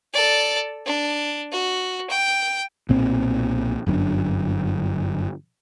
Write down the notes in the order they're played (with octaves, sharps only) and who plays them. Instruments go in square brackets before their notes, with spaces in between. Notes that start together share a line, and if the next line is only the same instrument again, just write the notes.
[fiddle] A4 D5
D4
F#4
G5
[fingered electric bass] B1 A#2 C4
G1 F#2 C#4 D4